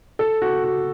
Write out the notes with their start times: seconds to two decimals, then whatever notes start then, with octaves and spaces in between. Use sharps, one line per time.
0.19 A4
0.42 F#4
0.64 F#4